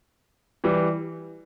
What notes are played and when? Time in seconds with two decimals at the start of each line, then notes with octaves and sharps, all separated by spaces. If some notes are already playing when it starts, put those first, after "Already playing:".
0.64 E3 G3